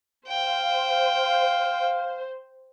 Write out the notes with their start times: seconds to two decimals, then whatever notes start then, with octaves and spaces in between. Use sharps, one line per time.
0.28 C5 F5 G5